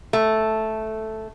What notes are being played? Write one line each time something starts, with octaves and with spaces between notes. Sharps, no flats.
A3